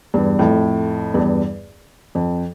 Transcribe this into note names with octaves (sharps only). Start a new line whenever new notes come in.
E2 G2
F2 A2
E2 G2
F2